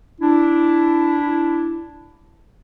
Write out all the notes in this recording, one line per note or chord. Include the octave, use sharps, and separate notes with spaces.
D4 E4